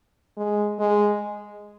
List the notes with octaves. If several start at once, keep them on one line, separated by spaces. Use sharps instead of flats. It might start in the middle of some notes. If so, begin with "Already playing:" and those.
G#3
G#3